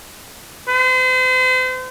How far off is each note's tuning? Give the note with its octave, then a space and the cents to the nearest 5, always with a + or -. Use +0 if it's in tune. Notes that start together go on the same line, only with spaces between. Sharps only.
C5 -40